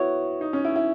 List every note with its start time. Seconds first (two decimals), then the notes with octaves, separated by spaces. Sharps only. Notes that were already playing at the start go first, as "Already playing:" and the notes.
Already playing: B3 E4 F#4 C#5
0.41 D#4
0.53 C#4
0.65 E4
0.76 E4